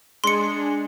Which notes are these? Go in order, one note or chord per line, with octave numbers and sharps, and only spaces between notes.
G#3 D4 G#4 C6 C#7